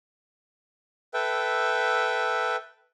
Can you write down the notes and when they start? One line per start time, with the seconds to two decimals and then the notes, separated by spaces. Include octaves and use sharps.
1.14 A4 B4 E5 G5